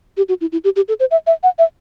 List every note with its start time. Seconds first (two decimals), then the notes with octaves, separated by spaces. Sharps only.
0.17 G4
0.29 F#4
0.41 E4
0.52 E4
0.64 G4
0.76 G4
0.88 A4
1.00 C5
1.11 E5
1.27 E5
1.43 F#5
1.59 E5